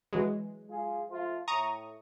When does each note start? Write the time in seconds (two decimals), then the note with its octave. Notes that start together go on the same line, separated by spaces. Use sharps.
0.13 E3 F#3 G#3
0.70 F4 G#4
1.08 F3 A3 F4
1.48 A2 A#5 C#6 D#6